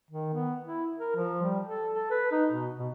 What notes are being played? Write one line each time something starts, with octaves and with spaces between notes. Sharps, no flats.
D#3
B3
E4
A#4
F3
G3
A4
A4
B4
D#4
B2
B2